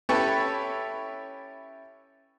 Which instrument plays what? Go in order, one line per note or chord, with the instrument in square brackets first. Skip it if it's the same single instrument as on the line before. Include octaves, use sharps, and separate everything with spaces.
[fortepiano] C#4 E4 G4 A4 B4 C#5